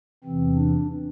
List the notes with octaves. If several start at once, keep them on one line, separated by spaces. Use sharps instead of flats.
E2 C3 E3 C4
D4